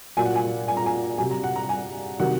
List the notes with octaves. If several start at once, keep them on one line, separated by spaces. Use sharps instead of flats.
A#2 F#3 G#5
F#5
G#5
G#5
A#5
G#5
C3 F#3 G#5
A#5
F#5
A#5
G#5
C3 D#3 F#3 F#5